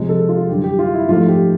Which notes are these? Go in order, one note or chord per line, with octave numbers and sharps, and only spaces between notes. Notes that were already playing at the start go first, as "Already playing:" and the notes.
Already playing: C3 F3 G#3
A4
F4
F#2 D3 G3 G4
G4
F4
E4
G#2 F3 A3 F4
G4